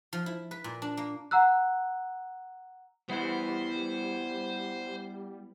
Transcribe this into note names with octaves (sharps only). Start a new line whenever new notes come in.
F3
E4
B4
A#2
D4
A#3
F#5 A#5 E6 F#6
G3 B3 E4 C5